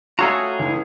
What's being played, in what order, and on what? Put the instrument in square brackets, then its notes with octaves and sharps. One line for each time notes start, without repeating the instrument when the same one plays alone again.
[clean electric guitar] A3 C#4 F4 [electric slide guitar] F#4 A4 D#5 [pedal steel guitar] G#4 A#5
[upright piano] C#2 E3